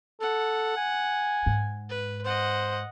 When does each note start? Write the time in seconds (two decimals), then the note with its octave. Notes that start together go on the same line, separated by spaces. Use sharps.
0.21 A4 F#5
0.77 G#5
1.46 G#2
1.89 B4
2.25 C5 D#5 F#5